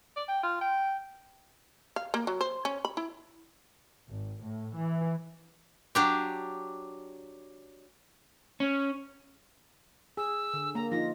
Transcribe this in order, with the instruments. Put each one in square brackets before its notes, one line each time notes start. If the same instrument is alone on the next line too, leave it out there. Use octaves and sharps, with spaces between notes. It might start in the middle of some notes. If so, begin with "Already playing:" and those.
[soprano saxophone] D5
G5
F4
G5
[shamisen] F5
A#3
F#3
C5
C#4
B5
E4
[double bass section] G#1
A2
E3
[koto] F#3 D4 G4
[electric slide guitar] C#4
[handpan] G#4 [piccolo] E6
[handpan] D3
[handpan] A#3 [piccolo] A#5
[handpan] F3 D#4 F4 [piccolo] A#6